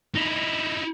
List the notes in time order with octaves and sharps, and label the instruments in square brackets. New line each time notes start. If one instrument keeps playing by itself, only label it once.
[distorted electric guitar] D#4 E4